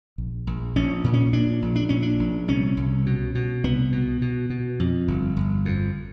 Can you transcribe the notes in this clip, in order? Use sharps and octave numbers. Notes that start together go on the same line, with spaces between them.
A#1
A#1
A#1 C#4
A#2
C#4
A#2 D4
A#1
D4
A#2 C#4
D4
A#1
C2 C#4
C2
B2
B2
C2 B3
B2
B2
B2
F2
G1
G1
F2